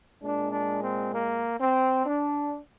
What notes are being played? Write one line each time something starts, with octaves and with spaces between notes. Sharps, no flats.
A#2 G#3 D4
D4
C4
A#3
C4
D4